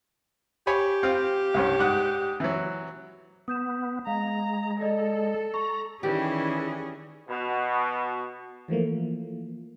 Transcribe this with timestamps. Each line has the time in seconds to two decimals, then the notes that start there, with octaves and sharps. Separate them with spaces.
0.67 G4 C#5 G#5 B5
1.03 C4 F4 F5
1.54 C2 G2 C#4
1.79 G#2 D5 F#5
2.40 E3 F#3
3.48 B3 D#6 G6 E7
4.07 G#3 F5 A#5
4.80 A4 D5 D#5 A#6
5.54 A#5 C#6
6.03 D#3 E3 G3 C#4 G4 G#4
7.29 B2
8.68 E3 F3 A3 A#3